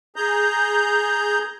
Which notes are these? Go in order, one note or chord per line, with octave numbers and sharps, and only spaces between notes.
G#4 A#5 G6